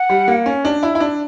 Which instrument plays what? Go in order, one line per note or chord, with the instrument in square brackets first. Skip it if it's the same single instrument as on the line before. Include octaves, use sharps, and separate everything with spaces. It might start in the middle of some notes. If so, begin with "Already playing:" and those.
Already playing: [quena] F#5
[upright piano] G3
A#3
C#4
D4
E4
E4
D4